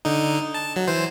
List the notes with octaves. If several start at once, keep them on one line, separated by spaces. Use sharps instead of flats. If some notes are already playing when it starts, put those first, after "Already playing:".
D3 D#4
A5
F#3
E3 C5